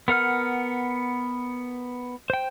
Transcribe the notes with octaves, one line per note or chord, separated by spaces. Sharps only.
B3 A#4 F#5 F6
C5 G5